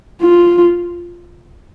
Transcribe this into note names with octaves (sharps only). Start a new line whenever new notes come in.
F4